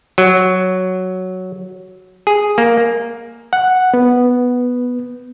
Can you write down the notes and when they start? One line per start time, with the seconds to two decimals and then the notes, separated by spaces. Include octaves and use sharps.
0.18 F#3
2.27 G#4
2.58 A#3
3.53 F#5
3.94 B3